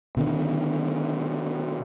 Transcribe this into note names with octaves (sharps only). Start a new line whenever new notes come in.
B2 D3 D#3